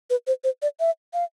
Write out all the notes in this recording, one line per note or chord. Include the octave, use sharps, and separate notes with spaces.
B4
C5
C5
D5
E5
F5